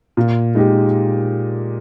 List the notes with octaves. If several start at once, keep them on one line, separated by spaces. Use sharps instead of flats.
A#2
G#3 D#4 G4